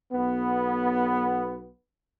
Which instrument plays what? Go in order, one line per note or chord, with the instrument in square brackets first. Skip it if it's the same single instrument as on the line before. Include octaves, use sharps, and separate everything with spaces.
[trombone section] B1 B3